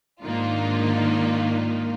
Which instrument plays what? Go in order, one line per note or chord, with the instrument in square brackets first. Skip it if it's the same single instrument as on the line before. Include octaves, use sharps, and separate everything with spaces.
[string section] G#2 D#3 A#3 D4 D#4 F4